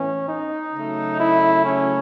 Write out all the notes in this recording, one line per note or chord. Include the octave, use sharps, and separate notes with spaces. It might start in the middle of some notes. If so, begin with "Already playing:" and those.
Already playing: A2 E3 B3 C#4
D#4
C#3 F#3 A3
E4
C#4